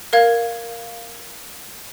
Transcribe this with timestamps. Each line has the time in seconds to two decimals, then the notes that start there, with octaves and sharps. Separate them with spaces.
0.13 A#4 F5 G#6